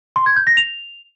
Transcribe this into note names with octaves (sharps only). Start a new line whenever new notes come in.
C6
G#6
G6
A#6
F7